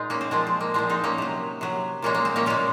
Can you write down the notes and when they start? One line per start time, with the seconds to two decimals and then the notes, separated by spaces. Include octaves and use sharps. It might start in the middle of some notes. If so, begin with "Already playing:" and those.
Already playing: A#2 G#3 D#4 F4 G#4
0.10 A#3 C#4
0.21 C4
0.31 A#2 F3 G#3 C4
0.47 C4
0.60 A#3
0.74 A#2 F3 G#3 C4
0.89 C4 D#4
1.04 A#3 C#4
1.18 C3 F#3
1.61 C3 F#3
2.02 A#2 G#3 A#3 C#4
2.15 A#3
2.25 C4
2.36 A#3 C#4
2.46 A#2 G#3 A#3 C#4